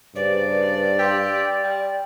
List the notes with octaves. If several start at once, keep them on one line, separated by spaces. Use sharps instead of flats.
G2 C#3 G4 B4 C5 D5
G4 F5 C6 E6
G3 G5